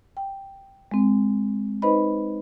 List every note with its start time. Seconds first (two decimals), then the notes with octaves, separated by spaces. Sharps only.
0.17 G5
0.91 G#3 C4
1.82 D#4 B4 C5 D#5 B5